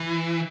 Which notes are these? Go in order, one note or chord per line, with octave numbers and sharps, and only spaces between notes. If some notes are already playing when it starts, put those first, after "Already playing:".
Already playing: E3